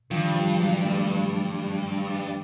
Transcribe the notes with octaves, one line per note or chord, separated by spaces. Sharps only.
G2 D#3 F3
F3 G3
F#3 G#3
G3 A3